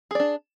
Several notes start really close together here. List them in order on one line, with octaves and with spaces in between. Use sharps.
G#4 D5 D4